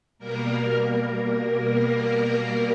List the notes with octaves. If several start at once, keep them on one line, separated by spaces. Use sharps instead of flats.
B2 G3 A#3 A#4